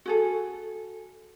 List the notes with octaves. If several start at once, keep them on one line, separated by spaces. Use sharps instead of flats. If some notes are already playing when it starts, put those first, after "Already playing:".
F#4 G#4 A4